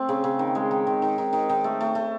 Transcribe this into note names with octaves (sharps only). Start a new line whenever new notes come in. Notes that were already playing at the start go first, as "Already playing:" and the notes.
Already playing: A3 C4
C#3
C#3
D#3
G#3
D#3
D#3
D#3
D#3
D#3
D#3
A3
A3
A3